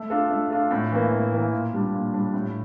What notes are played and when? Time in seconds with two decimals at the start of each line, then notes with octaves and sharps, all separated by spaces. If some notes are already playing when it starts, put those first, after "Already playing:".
Already playing: A3
0.10 D4 F4 A4
0.30 A3
0.50 D4 F4 A4
0.71 A2
0.92 E3 A#3
1.12 A2
1.32 E3 A#3
1.52 A#2
1.73 G3 D4
1.93 A#2
2.14 G3 D4
2.33 A2